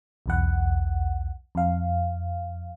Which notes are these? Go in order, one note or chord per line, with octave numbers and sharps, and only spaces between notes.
B1 E2 F#5
F2 F5